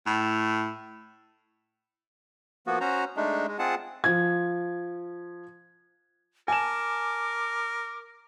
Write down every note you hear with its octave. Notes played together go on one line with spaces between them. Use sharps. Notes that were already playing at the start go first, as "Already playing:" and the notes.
A2
F3 A#3 B3 F#4
C#4 F#4 C5 A#5
G#3 A3 D4 D#4
G#3
C4 F4 G#4 F#5 A5
F3 G#6
A#4 G#5 A5 D6 E7